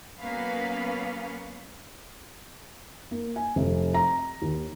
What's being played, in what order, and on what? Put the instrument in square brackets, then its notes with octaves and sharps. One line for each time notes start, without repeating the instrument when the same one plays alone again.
[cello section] F#3 A#3 B3 C#4 B4 F5
[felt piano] A#3
G#5
F1
A#5
D#2